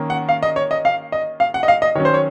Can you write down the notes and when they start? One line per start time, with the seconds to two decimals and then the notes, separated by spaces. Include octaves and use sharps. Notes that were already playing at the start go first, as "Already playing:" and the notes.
Already playing: D#3 A#3 C#4
0.10 F#5
0.29 F5
0.43 D#5
0.56 C#5
0.71 D#5
0.85 F5
1.12 D#5
1.40 F5
1.54 F#5
1.63 D#5
1.68 F5
1.82 D#5
1.95 D#3 F#3 C#4 C#5
2.05 C5
2.14 C#5